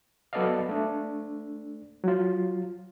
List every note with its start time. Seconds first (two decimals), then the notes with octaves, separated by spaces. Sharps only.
0.33 F#3 B3 A4 D5 D#5 F5
0.69 A3 D4
2.04 F#3 F4